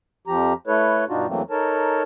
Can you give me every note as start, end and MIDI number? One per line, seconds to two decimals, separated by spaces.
0.27 0.53 41
0.27 0.53 53
0.27 0.53 67
0.27 0.53 82
0.67 1.05 57
0.67 1.05 64
0.67 1.05 69
0.67 1.05 71
0.67 1.05 73
1.08 1.26 43
1.08 1.26 47
1.08 1.26 62
1.08 1.26 63
1.08 1.26 65
1.08 1.26 66
1.28 1.42 40
1.28 1.42 52
1.28 1.42 54
1.28 1.42 57
1.28 1.42 58
1.28 1.42 60
1.50 2.03 63
1.50 2.03 69
1.50 2.03 70
1.50 2.03 73
1.50 2.03 81